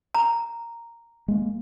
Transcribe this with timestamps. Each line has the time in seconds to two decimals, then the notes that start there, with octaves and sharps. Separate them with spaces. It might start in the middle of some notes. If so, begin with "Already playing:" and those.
0.15 A#5
1.28 G#3 A#3